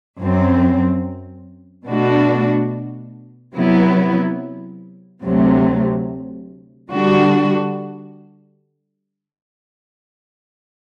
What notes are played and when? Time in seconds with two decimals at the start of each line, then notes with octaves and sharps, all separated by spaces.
0.20 F#2 F#3 C4
1.87 B2 A3 D4 F#4
3.54 C3 F#3 B3 E4
5.22 D2 C3 F#3 A3
6.90 D3 G3 D4 F#4